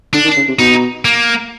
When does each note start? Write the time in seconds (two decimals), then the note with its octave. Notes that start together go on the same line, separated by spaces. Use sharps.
0.13 D3 D4
0.25 D#3
0.36 C#3
0.48 C3
0.59 B2 D#4
1.05 A#3